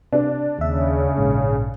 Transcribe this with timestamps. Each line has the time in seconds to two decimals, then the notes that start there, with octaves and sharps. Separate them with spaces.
0.13 C3 D4
0.59 D#2 C#3 E5
1.17 A#1 G#2